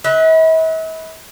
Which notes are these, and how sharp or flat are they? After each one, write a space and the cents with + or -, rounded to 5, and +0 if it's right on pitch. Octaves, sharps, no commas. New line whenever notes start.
B4 +0 E5 -45